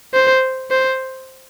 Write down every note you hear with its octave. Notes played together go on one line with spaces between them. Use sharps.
C5
C5